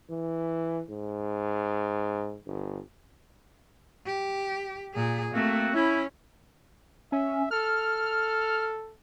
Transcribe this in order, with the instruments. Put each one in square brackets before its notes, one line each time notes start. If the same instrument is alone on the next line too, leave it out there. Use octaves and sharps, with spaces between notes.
[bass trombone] E3
G#2
G1
[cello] G4
A#2 G#4
[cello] A3 [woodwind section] A#3 C4 F#4
[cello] C#4 [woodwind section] E4
[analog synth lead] C#4 [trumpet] E5
[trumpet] A4 [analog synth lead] F6